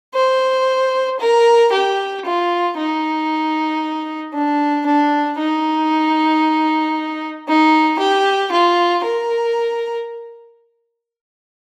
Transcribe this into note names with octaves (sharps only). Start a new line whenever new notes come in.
C5
A#4
G4
F4
D#4
D4
D4
D#4
D#4
G4
F4
A#4